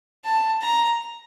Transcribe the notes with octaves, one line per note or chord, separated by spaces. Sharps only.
A5
A#5